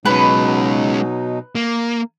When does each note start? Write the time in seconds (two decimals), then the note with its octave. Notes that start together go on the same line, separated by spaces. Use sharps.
0.06 B2 F#3 G#3 C#4 D#4 B4
1.55 A#3